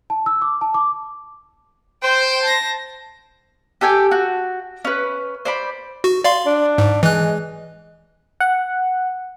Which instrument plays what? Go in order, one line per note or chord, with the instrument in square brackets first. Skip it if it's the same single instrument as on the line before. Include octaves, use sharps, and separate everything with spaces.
[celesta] A5
E6
D6
A5
D6
[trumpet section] C5 [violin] G5
[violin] A5 A#6
[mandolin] G4 A4 G5 G#5
F#4
C#4 B4
C5 D5 B5
[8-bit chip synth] F#4
D5 F5 C6
[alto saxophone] D4
[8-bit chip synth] G#2
[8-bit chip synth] E3 F#6 [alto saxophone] G#3
[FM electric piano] F#5